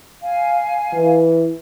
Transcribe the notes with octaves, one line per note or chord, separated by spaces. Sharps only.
F5 G#5
E3